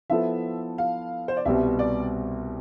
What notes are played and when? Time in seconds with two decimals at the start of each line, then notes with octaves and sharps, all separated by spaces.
0.09 F3 B3 E4 A4 C5 E5
0.78 F5
1.28 C5
1.37 D5
1.45 C2 B2 G3 C4 E5
1.79 D5